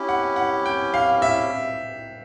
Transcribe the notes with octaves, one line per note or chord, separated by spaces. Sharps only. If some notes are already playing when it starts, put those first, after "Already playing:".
Already playing: C#4 E4 G4
F#5
F#5
G5
F5
E5